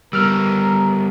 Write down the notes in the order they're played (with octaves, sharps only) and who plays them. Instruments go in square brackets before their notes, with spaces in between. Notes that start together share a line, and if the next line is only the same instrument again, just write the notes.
[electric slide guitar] G3 B3 [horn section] A#4 [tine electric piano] E6 F6